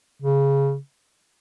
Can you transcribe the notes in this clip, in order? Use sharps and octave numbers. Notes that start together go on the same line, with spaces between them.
C#3